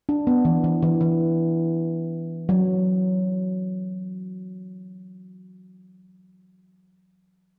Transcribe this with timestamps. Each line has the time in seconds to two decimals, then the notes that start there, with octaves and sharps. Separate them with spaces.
0.09 D4
0.27 B3
0.45 E3
0.64 E3
0.83 E3
1.01 E3
2.49 F#3